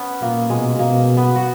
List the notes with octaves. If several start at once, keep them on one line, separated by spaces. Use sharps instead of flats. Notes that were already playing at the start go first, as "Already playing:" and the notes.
Already playing: B3 C#4
A#2 A#3
B2 G#3
B2 A#3
B3
F#4